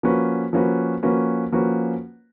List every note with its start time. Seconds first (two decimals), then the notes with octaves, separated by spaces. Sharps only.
0.03 F3 A#3 C#4 F#4 B4
0.53 F3 A#3 C#4 F#4 B4
1.03 F3 A#3 C#4 F#4 B4
1.52 F3 A#3 C#4 F#4 B4